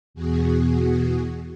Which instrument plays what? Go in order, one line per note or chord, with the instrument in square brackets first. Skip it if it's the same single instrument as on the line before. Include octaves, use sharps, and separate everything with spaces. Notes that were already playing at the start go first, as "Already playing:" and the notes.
[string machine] E2 B2 F#4 G#4